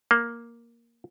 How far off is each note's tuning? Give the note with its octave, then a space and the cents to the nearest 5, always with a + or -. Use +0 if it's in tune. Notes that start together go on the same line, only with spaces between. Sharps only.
A#3 +5